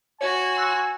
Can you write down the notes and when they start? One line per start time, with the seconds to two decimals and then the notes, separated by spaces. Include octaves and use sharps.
0.21 F#4 C#5 G#5 G#6
0.57 C6 E6 F#6